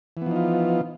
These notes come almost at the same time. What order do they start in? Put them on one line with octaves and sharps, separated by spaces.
E3 B3 F3 D#4 F4